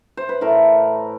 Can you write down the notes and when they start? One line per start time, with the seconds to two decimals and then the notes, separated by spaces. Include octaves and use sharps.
0.17 C5
0.29 B4
0.41 A2 E3 A3 A#4